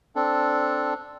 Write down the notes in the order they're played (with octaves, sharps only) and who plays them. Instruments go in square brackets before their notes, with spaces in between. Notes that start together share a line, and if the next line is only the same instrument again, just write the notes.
[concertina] C4 D4 A4